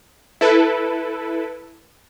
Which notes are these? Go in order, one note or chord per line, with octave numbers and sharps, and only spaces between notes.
E4 A4 B4